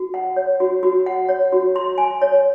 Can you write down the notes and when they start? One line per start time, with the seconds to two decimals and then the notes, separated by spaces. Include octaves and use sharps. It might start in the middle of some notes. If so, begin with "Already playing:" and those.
Already playing: F#4
0.14 F#5
0.36 C#5
0.60 F#4
0.83 F#4
1.06 F#5
1.29 C#5
1.53 F#4
1.76 C6
1.98 G#5
2.22 C#5